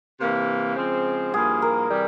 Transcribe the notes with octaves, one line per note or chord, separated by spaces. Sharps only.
C3 E3 A#3
C#3 F3 G#3 C4
G2 F3 A#3 E4 G#4
A#4
C3 E3 G3